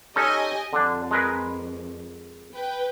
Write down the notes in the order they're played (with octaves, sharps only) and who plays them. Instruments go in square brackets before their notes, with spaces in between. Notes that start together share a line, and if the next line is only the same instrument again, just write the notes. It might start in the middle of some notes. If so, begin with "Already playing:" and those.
[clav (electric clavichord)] C#4 D#4 A4 [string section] G4 D#5 G#5
[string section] F2 [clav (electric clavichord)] D3 D4
[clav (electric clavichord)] G#3 A#4 B4
[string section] B4 G5